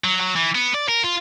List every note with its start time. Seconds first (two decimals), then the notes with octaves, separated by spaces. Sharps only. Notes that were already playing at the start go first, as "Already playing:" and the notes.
0.04 F#3
0.20 F#3
0.36 E3
0.55 B3
0.74 D5
0.89 A#4
1.04 F4